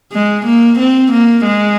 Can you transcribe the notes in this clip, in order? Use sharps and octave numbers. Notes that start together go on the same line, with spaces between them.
G#3
A#3
C4
A#3
G#3